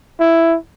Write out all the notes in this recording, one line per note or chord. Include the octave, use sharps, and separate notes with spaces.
E4